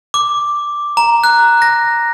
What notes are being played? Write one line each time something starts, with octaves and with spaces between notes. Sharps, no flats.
D6
A#5
F#6
A#6